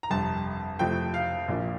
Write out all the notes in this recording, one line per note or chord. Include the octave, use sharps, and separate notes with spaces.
A#5
G1 F2 C3 A5
F2 C3 F3 A3 C4 G5
F5
A#1 A#2 F3